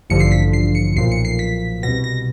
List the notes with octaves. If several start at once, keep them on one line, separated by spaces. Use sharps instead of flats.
A1 G2 D3 F3 C#7
C7
B6
C7
C#7
B1 A#2 F3 C7
C#7
C7
B6
C2 B2 A#6
A#6